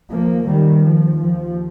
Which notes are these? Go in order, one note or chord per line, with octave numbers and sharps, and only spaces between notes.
D#2 F3 A#3
D#3 G3
F3
F3